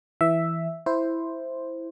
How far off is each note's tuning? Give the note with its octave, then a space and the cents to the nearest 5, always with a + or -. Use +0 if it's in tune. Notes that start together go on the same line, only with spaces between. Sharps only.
E3 +0 E5 +0
E4 +0 C5 +0